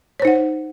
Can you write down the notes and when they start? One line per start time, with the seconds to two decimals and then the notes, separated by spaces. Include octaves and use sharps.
0.20 C#5
0.22 C5
0.25 D#4
0.27 F#5